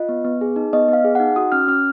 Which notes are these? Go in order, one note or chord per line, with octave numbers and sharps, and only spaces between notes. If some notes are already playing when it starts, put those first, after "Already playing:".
Already playing: F4 D#5
B3
B3
G#4
D#4
B3 D#5
B3 F5
G#4
D#4 F#5
F#4 D#6
C#4 F6
C#4 F6